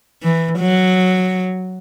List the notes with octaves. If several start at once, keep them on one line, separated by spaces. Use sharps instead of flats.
E3
F#3